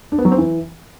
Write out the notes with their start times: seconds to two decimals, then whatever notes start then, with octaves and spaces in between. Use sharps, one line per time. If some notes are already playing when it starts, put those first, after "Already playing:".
0.12 D4
0.18 B3
0.25 F#3
0.31 C4
0.38 E3